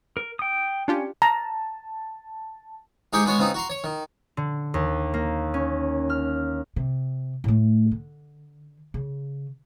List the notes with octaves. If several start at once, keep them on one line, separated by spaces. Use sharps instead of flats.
A#4
G5 D#6
C#4 D4 F4 G4
A5 A#5
G#2 D#4 G4 G#4 G5 C#6
G#3 B3 F#4 C#5 G#5
C#3 B3 C4 D#4
F#4 A#5 C6
C#5
D#3
D3
D#2
A#3
C#4
F6
C3
A2 A3
D3
C#3